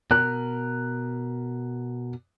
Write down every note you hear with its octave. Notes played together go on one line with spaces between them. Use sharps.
B2 A#4 F#6